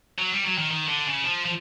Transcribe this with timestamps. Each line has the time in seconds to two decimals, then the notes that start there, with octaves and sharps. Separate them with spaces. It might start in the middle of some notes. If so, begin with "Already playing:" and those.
0.18 F#3
0.32 G3
0.44 F#3
0.58 D#3
0.71 D#3
0.88 D3
1.06 C#3
1.23 F3
1.45 F3